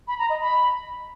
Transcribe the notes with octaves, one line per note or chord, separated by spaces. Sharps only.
B5
A#5
D#5
B5